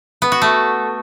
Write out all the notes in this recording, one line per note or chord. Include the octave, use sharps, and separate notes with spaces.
B3
F#4
A3